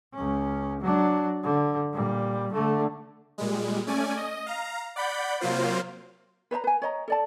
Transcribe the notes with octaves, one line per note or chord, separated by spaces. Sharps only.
C#2 C#4
F#3 D4
D3
A#2 G3
D3 A3
A#2 G3 G#3
A3 C#4 D5 G#5
D#5
F5 A#5
D5 F#5 B5 G6
C3 F#3 A#3 F4 C5
B4 C5 E5 A#5
B4 G#5
C#5 D#5 A#5
A4 D5 A5